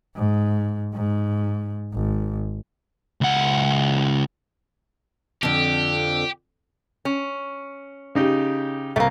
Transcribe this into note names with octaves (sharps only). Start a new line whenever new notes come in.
G#2
G#2
G#1
C#2 F#5
F2 D3 G4
C#4
C#3 D#4 G4
C2 A3 A#3